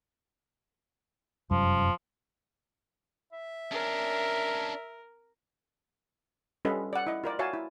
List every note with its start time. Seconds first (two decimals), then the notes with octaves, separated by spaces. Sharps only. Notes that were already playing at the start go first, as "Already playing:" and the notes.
1.51 F1 F#2 F3 G3
3.32 E5
3.72 C#4 D4 A#4
6.65 G3 C#4 F4 A4 B4 D#5
6.93 D5 F#5
7.07 E4 D#5
7.24 F4 A#4 D5
7.39 F#4 C#5 E5 F5 G#5 A5
7.53 E4